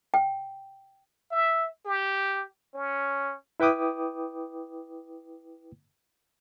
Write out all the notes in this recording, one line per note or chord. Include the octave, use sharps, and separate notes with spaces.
G5
E5
G4
C#4
E4 B4 G5 D6 D#6